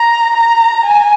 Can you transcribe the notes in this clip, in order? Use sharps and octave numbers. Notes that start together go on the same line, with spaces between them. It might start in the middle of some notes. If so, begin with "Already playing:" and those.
Already playing: A#5
A#5
G#5